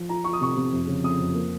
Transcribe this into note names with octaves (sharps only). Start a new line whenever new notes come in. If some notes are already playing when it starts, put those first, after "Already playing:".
Already playing: F3
F4 A#5
F4 C#6
D#6
C3 C#6
C3
F2
C#3
C4 D#6
F2
A#3